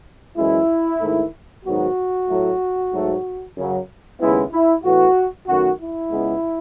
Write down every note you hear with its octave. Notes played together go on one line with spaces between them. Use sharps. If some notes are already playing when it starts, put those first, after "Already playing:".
F#2 E3 G#3 E4
G#2 D#3 A3
G#2 D#3 F#3 B3 F#4
A2 F#3 A3
G#2 F#3 A3
F#2 C#3 F#3
D#2 C#3 G#3 B3 E4
E4
A2 E3 B3 F#4
F#2 D#3 A3 F#4
E4
C#2 C#3 G#3 B3